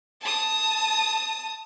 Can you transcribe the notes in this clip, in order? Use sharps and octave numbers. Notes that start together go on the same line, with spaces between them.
A5 D#6